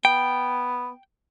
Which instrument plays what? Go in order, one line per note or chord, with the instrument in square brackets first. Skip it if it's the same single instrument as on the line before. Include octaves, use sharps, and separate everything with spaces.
[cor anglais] B3 [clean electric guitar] G5